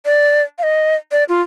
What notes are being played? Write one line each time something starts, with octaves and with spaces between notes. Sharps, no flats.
D5
F5
D#5
D5
F4